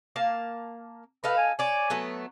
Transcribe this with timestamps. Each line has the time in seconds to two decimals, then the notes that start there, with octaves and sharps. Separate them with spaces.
0.16 A#3 F5 A5
1.24 D#4 A4 B4 F5
1.37 G#5
1.59 C#5 D5 G#5
1.90 F#3 A3 B3